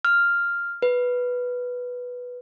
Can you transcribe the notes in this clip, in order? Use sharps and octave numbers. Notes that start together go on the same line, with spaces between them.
F6
B4